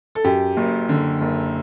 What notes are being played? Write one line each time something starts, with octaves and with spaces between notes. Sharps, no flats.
A4
F#2 G4
F#1
D3
F#1